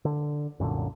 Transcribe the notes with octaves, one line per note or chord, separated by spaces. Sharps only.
D3
C2 F#2 A#2 D3